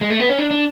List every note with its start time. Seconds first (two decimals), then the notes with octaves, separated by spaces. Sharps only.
0.01 G#3
0.10 A3
0.20 B3
0.29 C#4
0.39 D4
0.51 D4